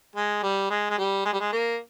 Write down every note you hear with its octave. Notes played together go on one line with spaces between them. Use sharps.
G#3
G3
G#3
G#3
G3
G#3
G3
G#3
A#3